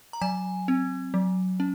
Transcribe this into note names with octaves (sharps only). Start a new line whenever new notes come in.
A#5
F#3 G#5
C4
F#3
C#4